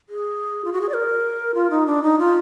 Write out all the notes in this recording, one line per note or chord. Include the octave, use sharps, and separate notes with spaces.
G#4
F4
F#4
G#4
D5
A#4
F4
D#4
D4
D#4
F4